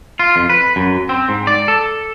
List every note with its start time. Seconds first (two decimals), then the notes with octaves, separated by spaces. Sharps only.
0.19 F4
0.36 F2
0.50 B4
0.76 F#2
1.09 C4
1.29 G#2
1.47 D5
1.68 A4